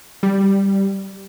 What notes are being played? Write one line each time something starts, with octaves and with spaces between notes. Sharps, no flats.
G3